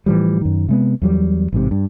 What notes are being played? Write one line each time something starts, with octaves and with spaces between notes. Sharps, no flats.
A2 E3 F3 G3
F#2 D#3
C3 G#3 B3
E2 F#3 G3
A1 G#2 C3
G2